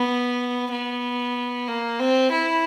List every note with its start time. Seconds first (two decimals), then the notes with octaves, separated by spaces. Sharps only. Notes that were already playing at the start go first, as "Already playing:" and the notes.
Already playing: B3
0.71 B3
1.68 A#3
2.00 C4
2.32 E4